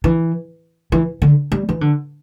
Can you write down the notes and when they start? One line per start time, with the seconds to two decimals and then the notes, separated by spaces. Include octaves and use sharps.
0.04 E3
0.92 E3
1.22 D3
1.52 G3
1.69 E3
1.81 D3